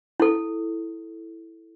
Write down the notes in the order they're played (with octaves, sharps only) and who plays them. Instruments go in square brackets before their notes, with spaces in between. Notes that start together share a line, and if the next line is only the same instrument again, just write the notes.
[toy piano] E4 A4